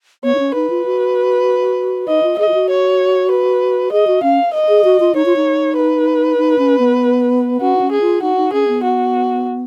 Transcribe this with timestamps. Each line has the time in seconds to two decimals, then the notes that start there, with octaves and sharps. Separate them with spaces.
0.24 B3 C#5
0.35 D#4
0.39 C#4
0.55 D#4 B4
0.70 F4
0.85 F#4
2.08 D#4 D#5
2.23 F4
2.38 G#4 D#5
2.49 F4
2.54 F#4
2.69 C#5
3.31 B4
3.92 G#4 D#5
4.07 F#4
4.23 C#4 F5
4.54 D#5
4.69 G#4
4.84 F#4
5.00 F4
5.15 D#4 C#5
5.26 F4
5.36 D#4
5.76 B4
6.38 D#4
6.58 C#4
6.79 B3
7.61 C#4 F#4
7.76 D#4
7.81 C#4
7.91 G#4
8.01 F4
8.22 D#4 F#4
8.37 D#4
8.53 C#4 G#4
8.68 B3
8.83 F#4